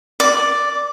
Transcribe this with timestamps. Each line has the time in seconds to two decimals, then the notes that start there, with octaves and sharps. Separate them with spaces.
0.20 D5